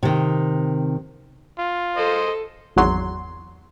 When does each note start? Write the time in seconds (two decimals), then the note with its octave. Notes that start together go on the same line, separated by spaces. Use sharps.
0.03 C3 D#3
1.59 F4
1.97 A4 C5 D#5
2.76 G#1 E2 F#3 C6